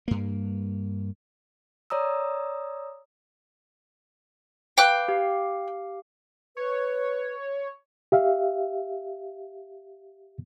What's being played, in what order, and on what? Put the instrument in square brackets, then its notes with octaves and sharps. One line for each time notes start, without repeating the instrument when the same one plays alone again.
[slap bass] G2 A#3
[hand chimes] C#5 D5 A#5 D#6 E6
[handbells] B4 F5 [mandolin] G5 D6 F#6
[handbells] G4 F5
[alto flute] B4 [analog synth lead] C#5
[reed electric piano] G4 E5 F5